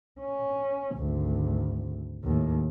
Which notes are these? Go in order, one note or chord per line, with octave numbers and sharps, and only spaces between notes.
C#4
G#1 D2
D#2 A2